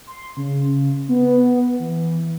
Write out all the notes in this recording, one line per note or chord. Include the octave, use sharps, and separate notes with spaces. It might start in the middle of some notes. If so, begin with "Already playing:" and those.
C6
C#3
B3
E3